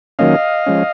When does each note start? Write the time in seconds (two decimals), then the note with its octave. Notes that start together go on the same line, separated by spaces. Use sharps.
0.19 D#3 F#3 A#3 C#4 D#5 F5
0.66 F3 G#3 C#4